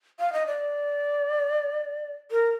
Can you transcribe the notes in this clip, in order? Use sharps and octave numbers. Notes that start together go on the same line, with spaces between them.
F5
D#5
D5
A#4